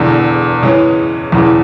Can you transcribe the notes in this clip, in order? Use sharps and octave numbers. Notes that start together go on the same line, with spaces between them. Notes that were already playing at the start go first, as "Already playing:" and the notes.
Already playing: E1 E2 D3
C#3 E3 G#3 C#4
E1 E2 C#3 E3 B3